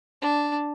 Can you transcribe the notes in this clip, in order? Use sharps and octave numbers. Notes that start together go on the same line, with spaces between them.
D4